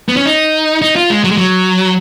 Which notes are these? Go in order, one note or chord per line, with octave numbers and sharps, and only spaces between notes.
B3
C#4
D#4
D#4
F4
G#3
F#3
G#3
F#3